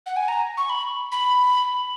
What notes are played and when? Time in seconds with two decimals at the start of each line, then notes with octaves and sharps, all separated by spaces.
0.06 F#5
0.16 G#5
0.28 A#5
0.57 C#6
0.70 B5
1.12 B5